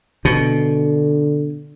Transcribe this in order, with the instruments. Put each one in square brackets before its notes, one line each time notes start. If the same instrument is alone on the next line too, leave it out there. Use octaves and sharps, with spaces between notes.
[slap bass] B2 [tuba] D3